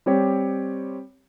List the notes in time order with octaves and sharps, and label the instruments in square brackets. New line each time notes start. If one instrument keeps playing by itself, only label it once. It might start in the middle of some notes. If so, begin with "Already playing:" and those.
[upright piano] G3 C4 G4 C#5